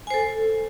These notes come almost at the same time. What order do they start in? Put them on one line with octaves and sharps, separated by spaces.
G#5 C5 A4